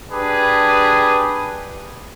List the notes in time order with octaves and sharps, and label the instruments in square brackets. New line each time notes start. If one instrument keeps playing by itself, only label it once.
[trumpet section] D4 G4 G#4 B4